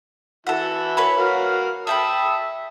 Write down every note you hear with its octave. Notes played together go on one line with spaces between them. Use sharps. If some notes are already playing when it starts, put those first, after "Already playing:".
E3 E4 F#4 A4 F#5
B4 C#5 B5
F#4 A#4 F5
E5 G5 A5 B5 D#6 E6